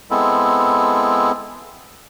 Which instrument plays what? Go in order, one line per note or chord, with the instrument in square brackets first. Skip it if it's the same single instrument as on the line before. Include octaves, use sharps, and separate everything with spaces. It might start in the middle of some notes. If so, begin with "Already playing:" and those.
[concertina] G#3 B3 C4 E4 A4